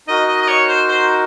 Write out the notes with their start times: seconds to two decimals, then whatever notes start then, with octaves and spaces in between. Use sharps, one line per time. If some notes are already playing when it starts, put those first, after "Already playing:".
0.07 D#4 F#4 A#4 D#5
0.28 D#5
0.43 D#5
0.48 C#5
0.68 C5
0.89 C5